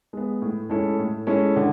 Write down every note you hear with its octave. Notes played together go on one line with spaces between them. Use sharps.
G#3 B3
A2
G#3 C#4 E4 A4
A2
G#3 C#4 E4 A4
D3